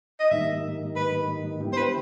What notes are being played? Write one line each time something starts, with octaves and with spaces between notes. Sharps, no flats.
D#5
G#2 D#3 G3 A#3 D#4 E5
B4
D3 G3 B3 E4 G4
C5
B4